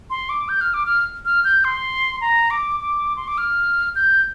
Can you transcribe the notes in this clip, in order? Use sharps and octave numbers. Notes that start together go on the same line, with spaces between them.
C6
D6
G6
F6
D6
F6
F6
G6
C6
A#5
D6
D6
C6
D6
F6
G6